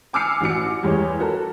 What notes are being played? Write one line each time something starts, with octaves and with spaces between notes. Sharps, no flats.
G#5 D6 E6 F6 C7 C#7
A1 F#4 D6 C#7
E2 G3 G#3 C#5
F#4 A4 A#4